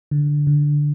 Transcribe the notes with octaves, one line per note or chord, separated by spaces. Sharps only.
D3
D3